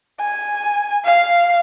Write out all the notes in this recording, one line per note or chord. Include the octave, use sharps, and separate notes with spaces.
G#5
F5